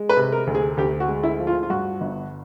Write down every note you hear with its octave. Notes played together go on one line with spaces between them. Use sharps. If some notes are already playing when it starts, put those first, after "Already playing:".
Already playing: G#3
B4
C3
A#4
D2
G#4
D2 G4
F#4
G#3
E4
F3
F4
F4
G2 F#4
G1